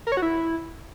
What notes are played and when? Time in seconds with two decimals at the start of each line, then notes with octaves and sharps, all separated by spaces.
0.07 A#4
0.12 C#5
0.17 F#4
0.22 E4